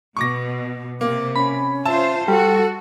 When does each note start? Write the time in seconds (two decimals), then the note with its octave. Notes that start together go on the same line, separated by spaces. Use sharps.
0.17 B2 C#6 D6 A#6
1.01 C3 A#3 D6
1.36 C#4 B5
1.86 F4 C5 E5 A5
2.28 G3 F#4 A4